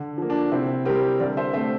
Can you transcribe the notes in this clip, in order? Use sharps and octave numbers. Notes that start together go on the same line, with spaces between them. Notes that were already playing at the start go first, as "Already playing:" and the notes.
Already playing: D3
F3 A#3
D4
C3 C4 E4
G3 C4 G4 A#4
D3 A#4 D5
C5 E5
A3 C4 C5 E5